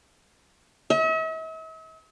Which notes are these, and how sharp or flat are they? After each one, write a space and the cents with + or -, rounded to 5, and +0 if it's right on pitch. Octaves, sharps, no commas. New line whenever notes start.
E5 -45